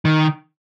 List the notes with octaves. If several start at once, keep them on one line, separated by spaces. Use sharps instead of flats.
D#3